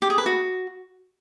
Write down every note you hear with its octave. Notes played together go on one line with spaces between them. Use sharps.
G4
G#4
B4
F#4